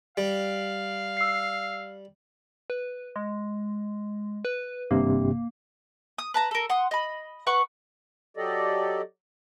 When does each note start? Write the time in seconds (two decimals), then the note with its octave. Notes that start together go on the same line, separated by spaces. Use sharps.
0.17 G3 F5
1.17 E6 C7
2.70 B4
3.16 G#3
4.45 B4
4.91 G#1 G2 C3 A#3
6.18 D#6
6.34 B4 A5 A#5
6.51 A4 A#4
6.70 F#5 C6 D#6
6.91 D#5 B5
7.47 B4 F#5 C#6
8.37 F#3 G4 A4 D5 D#5